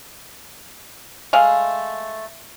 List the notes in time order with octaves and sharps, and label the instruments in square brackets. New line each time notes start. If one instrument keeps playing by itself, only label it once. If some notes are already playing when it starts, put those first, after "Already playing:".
[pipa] G#3 A3 F5